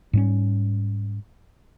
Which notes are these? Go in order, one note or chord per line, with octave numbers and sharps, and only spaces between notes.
G#2 G3 C#4